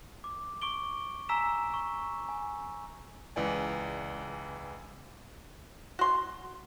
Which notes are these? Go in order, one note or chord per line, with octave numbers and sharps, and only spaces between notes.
D6
C#6 D6 D7 G7
G#5 A#5 E6 B6 E7
C#6
G#5
C#2 E3 D5 G#5
F#4 C6